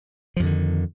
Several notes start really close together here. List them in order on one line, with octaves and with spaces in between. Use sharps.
F3 F2 D3 D#3